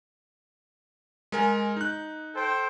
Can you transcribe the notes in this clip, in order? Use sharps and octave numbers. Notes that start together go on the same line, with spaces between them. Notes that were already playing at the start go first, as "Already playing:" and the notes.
G#3 A#4 G#5
D#4 F#6
A4 C5 G5